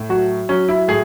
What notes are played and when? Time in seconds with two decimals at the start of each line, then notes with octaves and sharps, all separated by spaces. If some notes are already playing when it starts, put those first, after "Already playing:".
Already playing: A2
0.09 F#3 F#4
0.49 F#3 C#4
0.69 E4
0.88 A2 G#4